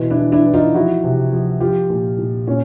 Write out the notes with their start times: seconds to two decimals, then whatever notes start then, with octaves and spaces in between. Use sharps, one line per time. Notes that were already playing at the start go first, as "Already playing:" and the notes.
Already playing: B2 E3
0.10 D4 E4
0.17 E3
0.32 D4 E4
0.46 E3
0.54 D#4 F4
0.74 F3 E4 F#4
1.04 C3
1.33 F3
1.60 F3 F4 G4
1.90 A#2
2.18 A#2
2.47 A#2 C#4